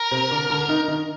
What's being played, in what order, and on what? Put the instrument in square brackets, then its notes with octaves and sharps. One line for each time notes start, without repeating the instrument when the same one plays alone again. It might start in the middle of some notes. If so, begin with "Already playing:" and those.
Already playing: [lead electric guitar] A#4
[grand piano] C3 C4
D3 D4
D3 D4
D4
D#3 D#4
D#3 D#4